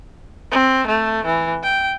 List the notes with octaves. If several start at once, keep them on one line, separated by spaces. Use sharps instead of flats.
C4
A3
E3
G5